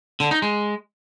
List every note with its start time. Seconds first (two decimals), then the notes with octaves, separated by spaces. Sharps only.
0.20 D3
0.31 D#4
0.42 G#3